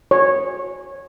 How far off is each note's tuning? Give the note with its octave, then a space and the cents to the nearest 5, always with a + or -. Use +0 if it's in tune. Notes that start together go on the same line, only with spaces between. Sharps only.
C#5 -15